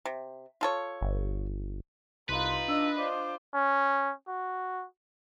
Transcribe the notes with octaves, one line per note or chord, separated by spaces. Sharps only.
C3
F4 A4 C#5
G1
C2 D#4 F4 B4 C6
D4 D#5 E6
F4 C5 D6
C#4
F#4